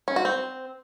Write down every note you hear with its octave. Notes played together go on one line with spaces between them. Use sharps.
C#4
F#4
C4